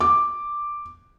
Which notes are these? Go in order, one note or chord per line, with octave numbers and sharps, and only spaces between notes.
D6